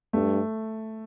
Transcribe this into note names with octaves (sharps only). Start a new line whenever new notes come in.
G2 A3